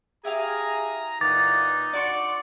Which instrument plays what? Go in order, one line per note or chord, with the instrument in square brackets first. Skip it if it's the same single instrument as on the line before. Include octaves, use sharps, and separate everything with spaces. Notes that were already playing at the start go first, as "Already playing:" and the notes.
[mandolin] E4 G4 F5 [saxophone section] G#4 [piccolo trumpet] A#5
[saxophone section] A#2 E3 F#5 [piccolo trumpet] D#4 [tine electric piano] D6 A6
[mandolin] F#4 C6 C#6 [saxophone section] D5